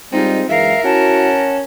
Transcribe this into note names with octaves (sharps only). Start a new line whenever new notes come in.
G3 G#3 C4 D#4 F4
F#2 E3 G#3 A#4 E5 F5
C#4 E4 F#4 F#5 A5